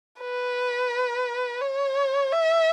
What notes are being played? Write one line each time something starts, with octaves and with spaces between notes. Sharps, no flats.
B4
C#5
E5